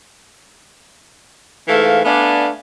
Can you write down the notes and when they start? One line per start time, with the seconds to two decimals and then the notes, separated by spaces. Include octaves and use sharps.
1.68 G#2 E3 A3 F5
2.05 A3 B3 D4 D5 F5 G#5